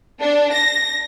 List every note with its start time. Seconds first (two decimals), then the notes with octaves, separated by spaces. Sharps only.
0.20 D4
0.53 A#6